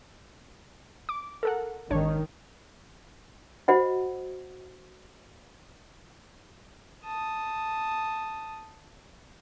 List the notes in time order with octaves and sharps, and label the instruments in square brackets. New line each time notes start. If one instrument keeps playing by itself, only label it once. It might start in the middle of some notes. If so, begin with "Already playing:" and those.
[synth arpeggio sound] D6
A4 A#4 F#5
[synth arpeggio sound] G#1 D4 C#5 [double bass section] D#3
[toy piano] F#4 C5 D#5 F#5
[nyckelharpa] A5 D#6